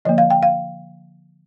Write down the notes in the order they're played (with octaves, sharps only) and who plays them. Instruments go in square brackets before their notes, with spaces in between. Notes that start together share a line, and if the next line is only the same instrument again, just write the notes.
[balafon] D3 F3 A#3 D#5
F5
G5
F5